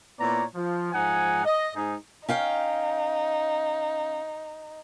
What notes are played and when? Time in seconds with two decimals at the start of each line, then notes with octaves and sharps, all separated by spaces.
0.19 A#2 B3 E4 C#5 D5 A#5
0.54 F3
0.93 G#2 F3 D#4 F#5 G#5
1.45 D#5
1.75 G#2 D#4 G#4
2.29 C#4 D#4 F5 G5